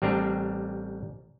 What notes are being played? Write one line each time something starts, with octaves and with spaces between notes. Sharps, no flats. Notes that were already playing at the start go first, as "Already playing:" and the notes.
A1 G3 C4 D4 A#4